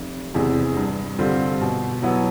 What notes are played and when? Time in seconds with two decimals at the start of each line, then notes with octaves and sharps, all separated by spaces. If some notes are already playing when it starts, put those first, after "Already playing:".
Already playing: F1
0.34 E2 C3 E3 G#3
0.77 G2
1.19 D3 G3 C4 F4
1.61 B2
2.02 F#3 B3 E4